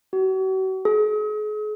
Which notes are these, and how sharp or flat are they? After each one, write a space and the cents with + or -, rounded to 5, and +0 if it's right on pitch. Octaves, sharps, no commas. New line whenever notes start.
F#4 +40
G#4 +40